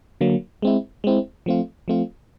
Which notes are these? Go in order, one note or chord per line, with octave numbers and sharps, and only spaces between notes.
D3 F#3 A#3
G#3 C4 E4
G#3 C4 E4
F3 A3 C4 F4
F3 A3 C4 F4